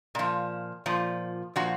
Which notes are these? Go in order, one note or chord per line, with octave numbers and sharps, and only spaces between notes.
A#2 F3
A#2 F3
A#2 F3 F#4